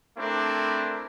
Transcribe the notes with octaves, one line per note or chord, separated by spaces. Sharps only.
A3 C4 D4 E4 A#4